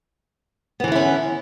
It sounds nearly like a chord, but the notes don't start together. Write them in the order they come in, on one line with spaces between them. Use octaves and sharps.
B3 E3 D3 E4 C#4